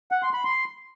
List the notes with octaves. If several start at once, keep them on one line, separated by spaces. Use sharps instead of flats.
F#5
C6
B5
C6